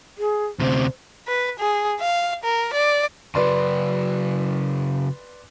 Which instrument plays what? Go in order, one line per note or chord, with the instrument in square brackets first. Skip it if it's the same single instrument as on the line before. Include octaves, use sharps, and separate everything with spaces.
[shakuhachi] G#4
[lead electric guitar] D2 C3 [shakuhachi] C5
[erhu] B4
G#4
F5
A#4
D5
[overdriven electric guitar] C#3 F#3 [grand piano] B4 D5 C6